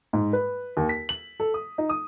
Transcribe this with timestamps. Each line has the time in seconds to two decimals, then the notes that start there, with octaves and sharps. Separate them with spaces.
0.13 G#2
0.33 B4
0.77 D#2
0.89 B6
1.09 F#7
1.40 A4
1.54 D#6
1.78 D#4
1.89 D#6